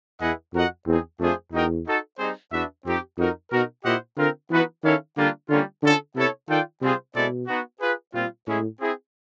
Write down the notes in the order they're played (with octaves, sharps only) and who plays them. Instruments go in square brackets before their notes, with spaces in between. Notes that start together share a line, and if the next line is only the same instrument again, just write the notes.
[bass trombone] E2 [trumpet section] E4 G#4 B4 D#5 F#5
[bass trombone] F2 [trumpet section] F#4 A#4 D#5 F#5
[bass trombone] E2 [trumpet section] C4 D#4 G#4
[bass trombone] F2 [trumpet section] A3 D4 F4 G#4 C5
[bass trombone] E2 [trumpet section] D#4 F#4 A#4 D#5 G5
[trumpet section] D#4 F#4 A4
G3 C4 D#4 G#4 C5
[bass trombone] E2 [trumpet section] D4 F#4 B4 E5
[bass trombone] F2 [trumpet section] C4 D#4 G4
[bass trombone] F2 [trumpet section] D#4 F#4 A#4
[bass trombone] B2 [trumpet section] D#4 F#4 A#4
[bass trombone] A#2 [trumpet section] E4 G4 C5 D#5 F#5
[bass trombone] D3 [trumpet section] C4 F4 A#4
[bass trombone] E3 [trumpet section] B3 D#4 F#4 B4
[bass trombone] D#3 [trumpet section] C#4 E4 A4 C#5 F5
[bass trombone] D3 [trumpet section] G3 A#3 D4 F4
[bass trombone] D3 [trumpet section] G3 A#3 C#4 F4
[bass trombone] D3 [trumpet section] C#4 F4 A4 C#5
[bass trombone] C3 [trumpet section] B3 E4 A4 C#5
[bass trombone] D#3 [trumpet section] F4 A4 D5 G5
[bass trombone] C3 [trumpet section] G3 C4 F4 G#4 C5
[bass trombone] B2 [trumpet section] G#3 C4 E4 A4 D5
[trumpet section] B3 D#4 F#4
F4 G#4 B4
[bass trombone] A#2 [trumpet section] G3 C4 F4
[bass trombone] A2 [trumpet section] G#3 C#4 E4 G#4
[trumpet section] C4 E4 G#4